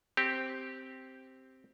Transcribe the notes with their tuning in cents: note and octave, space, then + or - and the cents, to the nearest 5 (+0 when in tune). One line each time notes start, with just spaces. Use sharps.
C4 +0 G4 -5